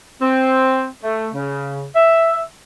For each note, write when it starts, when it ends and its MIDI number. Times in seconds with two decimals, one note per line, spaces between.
0.22 0.88 60
1.04 1.28 57
1.34 1.86 49
1.95 2.41 76